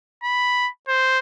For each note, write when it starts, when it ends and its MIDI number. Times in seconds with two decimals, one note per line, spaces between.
0.23 0.69 83
0.88 1.19 72